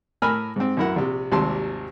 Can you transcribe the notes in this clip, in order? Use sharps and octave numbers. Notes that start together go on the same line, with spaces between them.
A2 A#4 G#5 B5 E6 F6
G#2 C4
B1 F#2 E4 A#4 F#5
A#1 C3
G#1 D#2 C3 G3 A5 C6